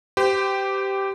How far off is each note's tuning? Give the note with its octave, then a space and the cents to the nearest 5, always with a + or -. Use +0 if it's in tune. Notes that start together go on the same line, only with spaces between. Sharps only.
G4 -5 C5 -40